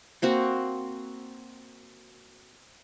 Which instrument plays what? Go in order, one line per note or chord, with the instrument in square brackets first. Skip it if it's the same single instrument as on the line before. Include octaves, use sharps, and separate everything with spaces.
[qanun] A#3 C4 F#4